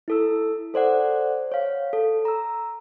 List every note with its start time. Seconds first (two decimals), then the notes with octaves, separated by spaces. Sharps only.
0.08 E4 A4 E6
0.74 A4 C5 D5 F#5
1.52 C#5 F5
1.93 A4
2.25 A#5 E6